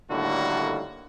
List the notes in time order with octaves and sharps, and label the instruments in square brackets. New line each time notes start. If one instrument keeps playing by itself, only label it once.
[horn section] A2 D3 D#3 G3 A#3 F#4